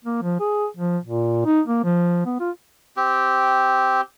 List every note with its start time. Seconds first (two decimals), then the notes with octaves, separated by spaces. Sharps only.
0.04 A#3
0.22 F3
0.40 G#4
0.77 F3
1.04 A#2
1.45 D#4
1.68 A#3
1.84 F3
2.26 B3
2.40 F4
2.97 C4 G4